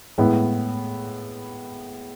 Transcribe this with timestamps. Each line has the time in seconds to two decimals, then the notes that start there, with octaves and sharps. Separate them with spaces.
0.18 A2 G#3 B3